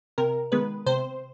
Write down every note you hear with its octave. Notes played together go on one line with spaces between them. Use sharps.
C3 A#4
D#3 G#3 B3 B4
C3 C5